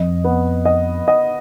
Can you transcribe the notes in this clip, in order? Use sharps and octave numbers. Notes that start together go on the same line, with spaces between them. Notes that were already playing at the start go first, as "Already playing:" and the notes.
Already playing: F2 D#5
B3
D#5
D#5